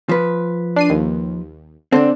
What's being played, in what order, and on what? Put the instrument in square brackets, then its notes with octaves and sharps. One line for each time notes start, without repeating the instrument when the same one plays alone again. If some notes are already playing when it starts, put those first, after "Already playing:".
[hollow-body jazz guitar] F3 B4
[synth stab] D4 C7 D#7
D#2
[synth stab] D3 [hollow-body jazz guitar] C4 D4